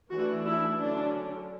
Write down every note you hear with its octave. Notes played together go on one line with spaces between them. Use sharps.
E3 A3 D4 F#4
E4
D3 F#3 C#4 D4